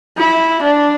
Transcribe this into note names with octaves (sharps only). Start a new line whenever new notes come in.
E4
D4